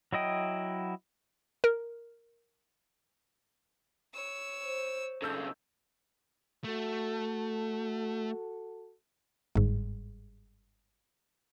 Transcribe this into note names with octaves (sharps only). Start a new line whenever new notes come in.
F#3 E4 D#5 G5
A#4
C#5 E6
C5
B1 C#3 A4 E6 G6
A3 F#4 A4
G1 G#2